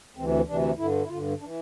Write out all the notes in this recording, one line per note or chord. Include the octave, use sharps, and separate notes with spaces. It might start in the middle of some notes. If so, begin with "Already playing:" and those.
D2 C3 E3 C4
D2 C3 E3 D4
G2 D3 E4
E4
G2 D3 F4
E3 D4